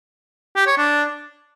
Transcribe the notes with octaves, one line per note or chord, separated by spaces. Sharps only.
G4
C#5
D4